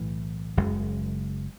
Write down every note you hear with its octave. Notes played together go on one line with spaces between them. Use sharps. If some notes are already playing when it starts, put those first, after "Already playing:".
Already playing: B1 A2 E3
F#1 F#2 C#3 G#3